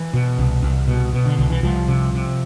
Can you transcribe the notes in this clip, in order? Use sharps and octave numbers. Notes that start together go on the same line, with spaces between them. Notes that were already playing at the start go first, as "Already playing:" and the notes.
Already playing: E3
B2
C2
C2
B2
B2
D3
C2 D3
E3
C2 F3
C3
C3